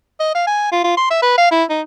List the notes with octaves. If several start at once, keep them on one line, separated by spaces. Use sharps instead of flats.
D#5
F5
G#5
F4
F4
C6
E5
B4
F5
E4
D#4